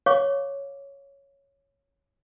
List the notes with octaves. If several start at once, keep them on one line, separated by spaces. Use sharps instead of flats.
C#5 F5 C#6 D6